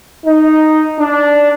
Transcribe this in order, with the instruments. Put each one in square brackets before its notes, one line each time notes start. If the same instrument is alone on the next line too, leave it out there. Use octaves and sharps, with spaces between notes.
[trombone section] D#4
D4